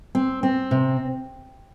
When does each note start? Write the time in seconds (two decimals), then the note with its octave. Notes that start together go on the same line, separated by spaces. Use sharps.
0.15 C4
0.43 C4
0.71 C3